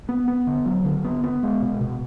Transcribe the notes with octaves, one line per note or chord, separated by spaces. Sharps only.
B3
B3
D3
F#3
D3
B3
B3
G#3
B2
B2